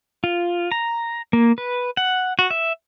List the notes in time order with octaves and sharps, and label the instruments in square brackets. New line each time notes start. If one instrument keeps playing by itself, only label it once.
[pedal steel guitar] F4
A#5
A#3
B4
F#5
F#4
E5